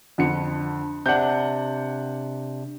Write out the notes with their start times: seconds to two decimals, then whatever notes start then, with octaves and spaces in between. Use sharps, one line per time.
0.18 F2 D3 C#7
1.06 C3 D4 F#5 G6